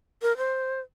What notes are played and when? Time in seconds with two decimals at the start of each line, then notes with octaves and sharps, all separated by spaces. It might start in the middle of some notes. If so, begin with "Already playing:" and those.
0.22 A#4
0.37 C5